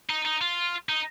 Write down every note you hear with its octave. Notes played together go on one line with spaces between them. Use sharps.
D#4
D#4
F4
D#4